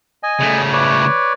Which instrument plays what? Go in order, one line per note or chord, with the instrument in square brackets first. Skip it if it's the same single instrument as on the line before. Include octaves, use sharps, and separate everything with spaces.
[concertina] D#5 G#5
[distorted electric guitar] C#3 A3
[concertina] B4 C#5 D5